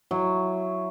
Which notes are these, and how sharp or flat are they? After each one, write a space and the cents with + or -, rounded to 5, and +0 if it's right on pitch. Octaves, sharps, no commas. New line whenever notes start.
F#3 +0 E4 +5